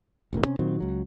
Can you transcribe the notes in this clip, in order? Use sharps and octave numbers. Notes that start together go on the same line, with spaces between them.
E1 A1 D#2 A#3
C3 C#4
A#2 D#3 F#3 C4
C#2 F#3